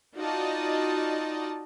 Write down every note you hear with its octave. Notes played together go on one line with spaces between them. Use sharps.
D#4 F4 F#4 D5 D#5 A5